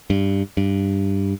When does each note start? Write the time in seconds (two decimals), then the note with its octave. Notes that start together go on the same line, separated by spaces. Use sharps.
0.10 G2
0.57 G2